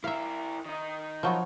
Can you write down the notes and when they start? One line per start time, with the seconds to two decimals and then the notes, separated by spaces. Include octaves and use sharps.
0.04 E4 A#4 E5 F5
0.66 D#3 D#4
1.23 F3 F#3 B3